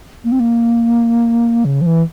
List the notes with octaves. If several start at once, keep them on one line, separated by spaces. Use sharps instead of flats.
A#3
C4
A#3
C#3
F3
E3